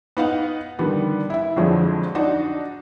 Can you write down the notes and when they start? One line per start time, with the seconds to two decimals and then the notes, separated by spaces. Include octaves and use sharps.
0.17 B3 D#4 F5 F#5
0.79 D3 D#3 G3 B3
1.30 E4 E5
1.56 F2 D3 F3 F#3 G#3
2.15 D4 D#4 F#4